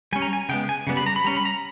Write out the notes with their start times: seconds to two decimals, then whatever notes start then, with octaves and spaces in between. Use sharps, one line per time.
0.13 G3 C#4 G#5
0.22 A#5
0.33 G#5
0.49 C#3 G#3 B3 G5
0.69 G#5
0.87 C#3 G3 B3
0.97 B5
1.06 A#5
1.16 B5
1.24 G3 C#4 A#5
1.37 B5
1.45 A#5